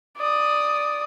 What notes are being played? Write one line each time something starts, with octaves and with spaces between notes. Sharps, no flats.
D5 D#6